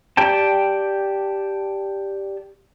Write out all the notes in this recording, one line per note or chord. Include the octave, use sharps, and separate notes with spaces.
G4 D5 G5 A5